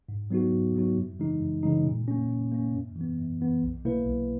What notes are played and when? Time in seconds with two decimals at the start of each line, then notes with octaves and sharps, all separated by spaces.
0.09 G#2
0.31 F#3 B3 D#4 F#4
0.53 G#2
0.75 F#3 B3 D#4 F#4
0.97 F#2
1.19 C#3 E3 G#3 D#4
1.41 F#2
1.63 C#3 E3 G#3 D#4
1.86 A#2
2.08 A#3 C#4
2.30 A#2
2.52 A#3 C#4
2.74 F#2
2.96 E3
3.01 B3
3.18 F#2
3.41 E3 B3
3.62 B1
3.85 B2 A#3 E4 B4
4.07 B1